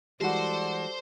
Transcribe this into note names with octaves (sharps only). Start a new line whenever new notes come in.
E3 G3 G#3 F#4 A4 C5 D5